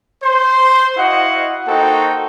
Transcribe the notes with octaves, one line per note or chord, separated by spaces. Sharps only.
C5 C6
E4 F#4 D#5 F5 F#5
A#3 D#4 F#4 A4 C5 G5